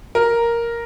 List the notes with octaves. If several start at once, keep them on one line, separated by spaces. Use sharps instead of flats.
A#4